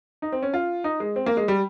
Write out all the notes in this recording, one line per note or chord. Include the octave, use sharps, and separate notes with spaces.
D#4
C4
C#4
F4
D#4
G#3
C4
A#3
G#3
G3